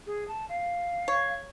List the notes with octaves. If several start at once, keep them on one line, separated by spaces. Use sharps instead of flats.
G#4
A5
F5
C#5